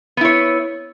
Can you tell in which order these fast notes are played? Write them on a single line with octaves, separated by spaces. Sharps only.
B3 E4 C#5